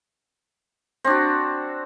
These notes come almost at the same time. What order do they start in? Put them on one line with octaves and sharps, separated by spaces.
C4 D4 F#4